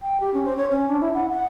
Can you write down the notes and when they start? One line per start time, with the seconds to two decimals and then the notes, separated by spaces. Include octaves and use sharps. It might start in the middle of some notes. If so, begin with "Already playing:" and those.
0.02 G5
0.20 G4
0.34 C#4
0.45 C5
0.57 C#5
0.71 C#4
0.88 D4
1.01 E4
1.14 F#5
1.30 F#5